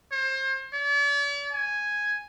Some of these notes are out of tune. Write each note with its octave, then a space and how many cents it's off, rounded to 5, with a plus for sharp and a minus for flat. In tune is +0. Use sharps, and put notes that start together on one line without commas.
C5 +30
D5 -45
G#5 +0